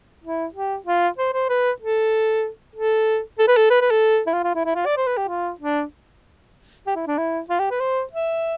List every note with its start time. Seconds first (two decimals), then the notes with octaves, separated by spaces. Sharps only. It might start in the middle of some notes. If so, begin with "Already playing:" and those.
0.24 E4
0.54 G4
0.86 F4
1.18 C5
1.34 C5
1.50 B4
1.82 A4
2.75 A4
3.39 A4
3.48 B4
3.57 A4
3.70 B4
3.81 B4
3.91 A4
4.27 E4
4.34 F4
4.44 F4
4.55 E4
4.66 E4
4.75 F4
4.86 D5
4.97 C5
5.07 B4
5.17 G4
5.28 F4
5.60 D4
6.87 G4
6.96 E4
7.07 D4
7.18 E4
7.50 F4
7.60 G4
7.71 B4
7.80 C5
8.13 E5